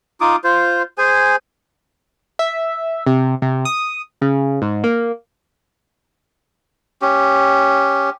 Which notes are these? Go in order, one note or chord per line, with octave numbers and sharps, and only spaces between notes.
D#4 F4 D6 D#6
F4 C5
G#4 C5 G#5
E5
C3
C3
D#6
C#3
G#2
A#3
C#4 G4